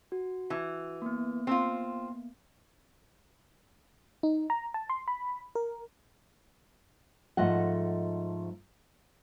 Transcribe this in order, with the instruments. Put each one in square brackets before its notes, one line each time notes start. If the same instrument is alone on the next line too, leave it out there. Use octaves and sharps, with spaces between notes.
[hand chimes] F#4
[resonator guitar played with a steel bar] E3
[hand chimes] A#3 B3
[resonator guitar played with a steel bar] C4 F4
[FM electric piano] D#4
A#5
A5
C6
B5
A#4
[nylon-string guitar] G#2 F3 A3 D#5 F#5